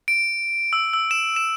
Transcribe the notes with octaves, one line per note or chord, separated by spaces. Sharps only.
D7
E6
E6
E7
E7